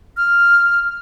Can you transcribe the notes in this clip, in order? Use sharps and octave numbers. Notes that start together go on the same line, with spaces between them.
F6